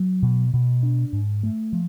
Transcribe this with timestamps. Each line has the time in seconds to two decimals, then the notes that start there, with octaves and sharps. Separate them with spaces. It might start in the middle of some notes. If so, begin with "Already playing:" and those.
Already playing: F#3
0.23 B2
0.54 B2
0.83 D4
1.13 G#2
1.43 A3
1.73 F3